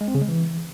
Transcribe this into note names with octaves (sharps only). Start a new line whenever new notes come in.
G#3
C4
C#3
G#3
E3